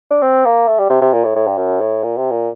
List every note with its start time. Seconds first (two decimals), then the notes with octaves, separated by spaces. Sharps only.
0.11 D4
0.22 C4
0.45 A#3
0.67 A3
0.79 G3
0.90 C3
1.01 C3
1.13 A#2
1.24 A2
1.35 A2
1.47 G2
1.58 F#2
1.80 A2
2.03 A#2
2.17 C3
2.31 A#2